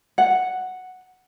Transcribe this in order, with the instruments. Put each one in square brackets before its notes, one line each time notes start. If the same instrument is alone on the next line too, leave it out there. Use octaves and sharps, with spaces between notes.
[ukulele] F#5